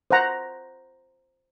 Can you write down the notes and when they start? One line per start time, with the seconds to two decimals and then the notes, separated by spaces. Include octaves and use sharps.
0.11 C5 F#5 A#5